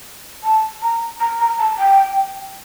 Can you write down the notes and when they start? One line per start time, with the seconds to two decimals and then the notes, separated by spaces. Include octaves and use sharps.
0.43 A5
0.82 A#5
1.20 A#5
1.40 A#5
1.59 A5
1.78 G5